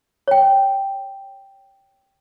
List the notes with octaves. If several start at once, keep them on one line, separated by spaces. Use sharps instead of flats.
C#5 G5